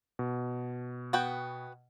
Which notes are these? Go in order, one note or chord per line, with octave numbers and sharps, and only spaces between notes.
B2
B3 F#4 G5